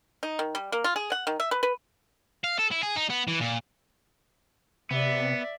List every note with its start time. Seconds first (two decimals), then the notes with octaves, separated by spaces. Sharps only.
0.23 D#4
0.39 D#3
0.55 G3
0.72 A#3
0.84 F4
0.96 G#4
1.12 F#5
1.27 D#3
1.40 E5
1.51 B4
1.63 B4
2.44 F5
2.59 A4
2.72 E4
2.83 G#4
2.96 D#4
3.10 B3
3.28 E3
3.40 A#2
4.91 C3 B3 D5 E5